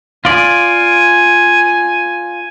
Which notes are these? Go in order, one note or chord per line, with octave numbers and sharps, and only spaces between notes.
F4 D5 G#5